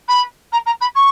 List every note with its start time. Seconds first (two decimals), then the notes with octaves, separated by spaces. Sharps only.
0.08 B5
0.52 A#5
0.66 A#5
0.81 B5
0.95 C#6